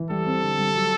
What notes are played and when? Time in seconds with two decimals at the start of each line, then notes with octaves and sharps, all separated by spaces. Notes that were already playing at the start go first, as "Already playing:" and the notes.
Already playing: E3
0.10 G3 A4
0.26 C4
0.42 D3
0.58 G3
0.75 F#3